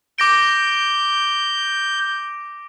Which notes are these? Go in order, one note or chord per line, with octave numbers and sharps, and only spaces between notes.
D6 G6 A#6 D7